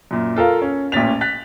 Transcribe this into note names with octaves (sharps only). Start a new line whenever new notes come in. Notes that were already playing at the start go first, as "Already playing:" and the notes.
F#2 A#2
F4 A4 A#4 F5
C#4
A1 A#2 C#4 A6 B6 F7
F#6 A6 B6